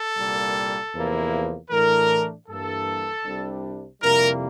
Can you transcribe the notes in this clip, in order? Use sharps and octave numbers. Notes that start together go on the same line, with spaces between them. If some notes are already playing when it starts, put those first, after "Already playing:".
Already playing: A4
C2 A#2 G3 A#3
E2 C3 F3 A#3 E4
A2 E3 A3 D4 A#4
G2 E3 A#3 A4
C2 C3 G3 D4
F2 C3 G3 A#3 E4 A#4